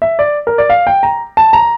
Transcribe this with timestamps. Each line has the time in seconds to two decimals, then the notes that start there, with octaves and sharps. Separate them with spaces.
0.02 E5
0.19 D5
0.47 A#4
0.58 D5
0.70 F5
0.87 G5
1.03 A#5
1.37 A5
1.53 A#5